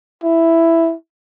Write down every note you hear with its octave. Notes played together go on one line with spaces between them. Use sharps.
E4